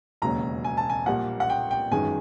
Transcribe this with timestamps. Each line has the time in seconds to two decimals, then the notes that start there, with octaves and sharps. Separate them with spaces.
0.22 E1 D#2 C#3 F#3 A#5
0.64 G#5
0.77 A5
0.90 G#5
1.06 A#1 A#2 G3 A#3 F#5
1.40 F#5
1.50 G5
1.71 G5
1.91 G1 F#2 D#3 G#3 G#5